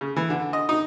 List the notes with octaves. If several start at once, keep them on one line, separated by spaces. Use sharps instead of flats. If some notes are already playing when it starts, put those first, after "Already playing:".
C#3
E3
D3
D#5
D#4